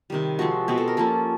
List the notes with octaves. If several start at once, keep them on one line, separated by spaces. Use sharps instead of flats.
C3 D#3 G3
F3 G#3 C4 F#4
B2 G#3 C4 G4
A4
A#4
F3 A#3 C#4 A4